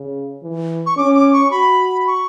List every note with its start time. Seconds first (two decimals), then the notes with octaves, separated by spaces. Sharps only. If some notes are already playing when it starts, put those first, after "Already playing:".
Already playing: C#3
0.42 E3
0.86 C#6
0.97 C#4 D6
1.15 D6
1.33 C#6
1.51 F#4 B5
2.07 C#6